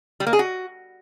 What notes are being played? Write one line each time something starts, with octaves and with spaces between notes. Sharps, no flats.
G3
A#3
G#4
F#4